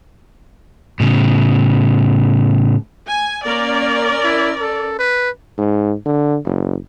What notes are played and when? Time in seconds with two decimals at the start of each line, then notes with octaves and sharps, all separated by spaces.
1.00 A2 C#3
3.07 G#5
3.46 A#3 C#4 A#4 D5
4.24 E4
4.61 A4
4.99 B4
5.58 G#2
6.06 D3
6.45 F#1